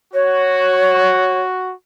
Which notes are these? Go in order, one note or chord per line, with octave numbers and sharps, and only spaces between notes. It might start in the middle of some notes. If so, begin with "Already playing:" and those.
F#4 C#5